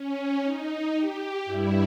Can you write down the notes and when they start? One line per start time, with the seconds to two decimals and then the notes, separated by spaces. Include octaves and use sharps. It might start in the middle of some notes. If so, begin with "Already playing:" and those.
Already playing: C#4
0.43 D#4
0.94 G4
1.45 G2 G3 E4